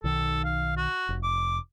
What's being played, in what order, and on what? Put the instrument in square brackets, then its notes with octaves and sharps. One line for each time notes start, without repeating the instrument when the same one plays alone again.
[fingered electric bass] B1 D#3 [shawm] A4
[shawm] F5
F#4
[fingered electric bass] F1
[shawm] D6